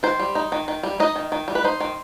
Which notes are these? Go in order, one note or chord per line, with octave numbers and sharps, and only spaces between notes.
D#3 C5
G3
D#4
D#3
D#3
G3
D#4 D#5
D#3
D#3
G3
B4
D#4 C5
D#3